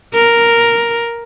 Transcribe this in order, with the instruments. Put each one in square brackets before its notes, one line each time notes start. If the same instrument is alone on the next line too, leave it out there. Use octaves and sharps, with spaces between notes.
[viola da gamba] A#4